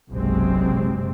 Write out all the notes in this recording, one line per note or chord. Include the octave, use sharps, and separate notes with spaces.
F#1 B1 C3 F#3 G#3 C4